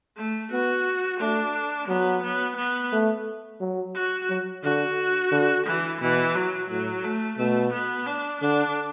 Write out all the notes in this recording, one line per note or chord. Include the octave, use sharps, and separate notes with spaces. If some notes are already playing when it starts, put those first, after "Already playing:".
A3
B3 F#4
A3 D4
F#3 B3
B3
B3
A3
F#3
F#4
F#3
D3 F#4
D3
E3
B2 E3
F#3
A2 F#3
A3
B2 A3
B3
D4
D3 D4